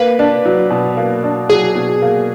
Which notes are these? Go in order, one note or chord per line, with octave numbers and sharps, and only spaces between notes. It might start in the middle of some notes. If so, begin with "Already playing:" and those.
Already playing: A#3 B4
D4
F#3
B2
A#3
D4
F#3 G#4
B2
A#3